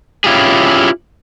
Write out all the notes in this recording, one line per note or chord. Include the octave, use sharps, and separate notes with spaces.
C#4 E4 F4 G4 G#4